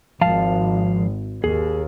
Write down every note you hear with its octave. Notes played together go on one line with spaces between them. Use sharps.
G#1 F3 F5 A5
D#2 G#4